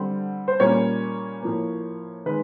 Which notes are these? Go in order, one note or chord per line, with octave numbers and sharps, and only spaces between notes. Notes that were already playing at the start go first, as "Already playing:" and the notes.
Already playing: D3 G3 C4
C5
A#2 G3 A#3 C#4 C#5
A2 F3 A#3
D#3 G#3 B4